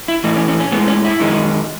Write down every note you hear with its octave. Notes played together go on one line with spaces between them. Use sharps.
E4
A2 E3 A3 D#4
C#4
C#4
C#4
A2 G#3 B3
C#4
E4
F#2 D#3 G#3